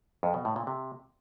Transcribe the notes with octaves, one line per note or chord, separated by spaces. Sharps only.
F2
B2
A2
A#2
C3